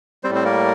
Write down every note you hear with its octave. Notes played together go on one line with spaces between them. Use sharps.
G3 C4 C5
A2
C4 C5
A#3 A#4